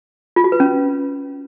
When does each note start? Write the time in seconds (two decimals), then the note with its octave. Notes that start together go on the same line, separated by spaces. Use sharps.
0.36 F4
0.44 F#4
0.52 B4
0.60 C#4